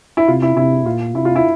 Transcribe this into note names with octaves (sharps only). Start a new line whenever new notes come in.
E4
C3 F4
E4
C3 E4
A#2 F4
C3 E4
F4
E4